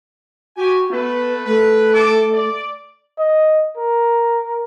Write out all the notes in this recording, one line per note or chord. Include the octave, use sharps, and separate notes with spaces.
F#4 G4 G#5
A3 B3 B4
A3 B4
A4 A5 D6
D5
D#5
A#4